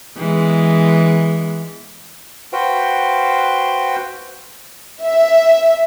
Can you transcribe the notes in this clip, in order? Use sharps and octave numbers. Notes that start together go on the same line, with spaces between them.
E3 G#3 B3
F#4 B4 C5 F5 G5
E5